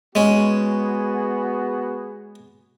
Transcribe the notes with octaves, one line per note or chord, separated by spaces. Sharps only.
G#3 B3 C#4 F#4 G#4